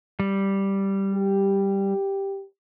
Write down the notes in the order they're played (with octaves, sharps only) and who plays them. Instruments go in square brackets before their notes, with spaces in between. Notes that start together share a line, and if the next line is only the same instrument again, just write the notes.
[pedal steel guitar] G3
[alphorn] G4